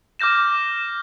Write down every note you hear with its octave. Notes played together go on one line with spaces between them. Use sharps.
D6 F6 G6 A#6 E7